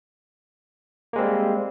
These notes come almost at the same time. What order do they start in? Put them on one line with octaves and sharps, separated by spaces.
A#3 G#3 C4 G3